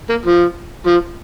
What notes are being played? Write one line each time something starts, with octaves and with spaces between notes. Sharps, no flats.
A#3
F3
F3